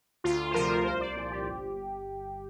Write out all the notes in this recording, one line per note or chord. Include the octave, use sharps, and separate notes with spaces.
D2 F4
C5
C3 F3 A#4
C2 C5
D5
A#2 F3 C5
G4
G1